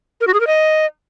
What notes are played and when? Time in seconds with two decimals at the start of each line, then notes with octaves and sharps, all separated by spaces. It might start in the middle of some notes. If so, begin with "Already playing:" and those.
0.21 A#4
0.27 F#4
0.34 G#4
0.40 A#4
0.47 D#5